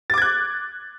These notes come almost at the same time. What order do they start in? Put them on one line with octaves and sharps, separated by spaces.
A6 D6 G#6 F#6